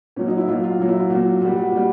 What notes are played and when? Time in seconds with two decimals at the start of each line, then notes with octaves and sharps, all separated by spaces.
0.16 A#2 F#3 C#4
0.28 D#4
0.38 E4
0.47 A#2 F#3 F4
0.64 F4
0.79 A#2 F#3
0.89 E4
1.00 F4
1.10 A#2 F#3 F#4
1.41 A#2 G3 F#4
1.56 F#4
1.72 A#2 G3